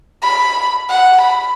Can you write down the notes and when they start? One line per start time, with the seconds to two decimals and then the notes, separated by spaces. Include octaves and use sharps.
0.22 B5
0.89 F#5
1.21 B5